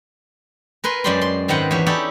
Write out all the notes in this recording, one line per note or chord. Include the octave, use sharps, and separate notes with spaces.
A#4 B4 G#5 C6
F#2 G#3 D5 G5 B5 C6
C6
G#2 D#3 C4 B4 F#5 G5
E2 G4 C#5 E5
C#4 D#4 E4 G4 A4 D5